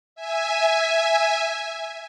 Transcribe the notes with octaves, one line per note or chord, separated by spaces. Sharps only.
E5 G#5